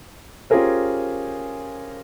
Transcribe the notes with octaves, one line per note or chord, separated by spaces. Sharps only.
C#4 F4 G4 G#4 A#4 C5